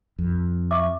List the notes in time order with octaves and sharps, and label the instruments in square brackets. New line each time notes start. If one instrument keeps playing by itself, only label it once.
[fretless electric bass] F2
[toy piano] E5 C#6 D6